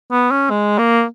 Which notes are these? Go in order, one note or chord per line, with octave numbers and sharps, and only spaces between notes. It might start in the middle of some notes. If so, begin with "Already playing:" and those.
B3
C#4
G#3
A#3